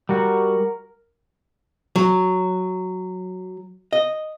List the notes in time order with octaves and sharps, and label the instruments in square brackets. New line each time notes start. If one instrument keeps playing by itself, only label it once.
[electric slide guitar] G3 F#4 [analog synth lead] A#4
[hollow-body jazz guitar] F#3
D#5